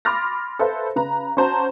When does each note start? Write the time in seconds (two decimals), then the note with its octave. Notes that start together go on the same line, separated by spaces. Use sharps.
0.05 B5 C6 D6 F6 A6 A#6
0.59 A4 B4 C5 E5 F5
0.96 C#3 B4 A#5
1.37 C#4 F#4 C5 A5 A#5